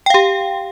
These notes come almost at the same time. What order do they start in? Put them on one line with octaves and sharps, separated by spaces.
G5 F5 G4